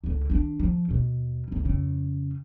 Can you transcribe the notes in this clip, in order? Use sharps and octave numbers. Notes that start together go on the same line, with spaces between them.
C#2 D3
D#3 D4
F3
D#2 B2
G1 C#2
F2 C#3